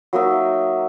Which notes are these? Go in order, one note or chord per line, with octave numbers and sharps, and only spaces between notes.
F#3 A#3 D#4 E5